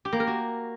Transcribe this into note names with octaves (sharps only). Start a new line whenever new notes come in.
G4
A#3
A#4
F#4